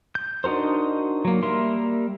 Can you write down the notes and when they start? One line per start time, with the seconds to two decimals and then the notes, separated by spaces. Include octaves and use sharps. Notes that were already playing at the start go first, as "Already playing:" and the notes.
0.15 G6
0.44 D4 D#4 F#4 A#4 C5
1.25 F#3 A#3
1.43 G3 A#3 A#4 E5 C6